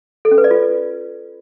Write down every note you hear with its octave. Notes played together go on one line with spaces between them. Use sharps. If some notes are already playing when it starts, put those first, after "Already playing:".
A4
C#4
B4
D5
F4